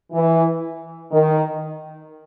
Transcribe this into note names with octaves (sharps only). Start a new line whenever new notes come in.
E3
D#3